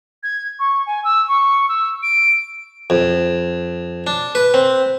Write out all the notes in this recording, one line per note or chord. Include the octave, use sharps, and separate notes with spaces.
G#6
C#6
G#5
E6
C#6
E6
D7
F2
D4
B4
C4